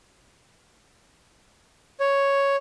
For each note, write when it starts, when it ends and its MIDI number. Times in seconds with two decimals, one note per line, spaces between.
2.00 2.56 73